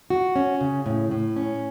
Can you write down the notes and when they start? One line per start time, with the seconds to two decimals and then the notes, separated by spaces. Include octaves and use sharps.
0.10 F#4
0.36 C#4
0.61 C#3
0.86 A2
1.11 A2
1.36 C#4